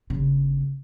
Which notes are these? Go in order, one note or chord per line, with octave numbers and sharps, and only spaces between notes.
G1 C#3